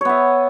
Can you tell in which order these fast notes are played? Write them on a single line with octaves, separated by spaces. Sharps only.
C#5 B3 E5